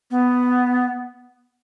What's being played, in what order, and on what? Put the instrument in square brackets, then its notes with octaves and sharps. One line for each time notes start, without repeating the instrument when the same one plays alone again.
[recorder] B3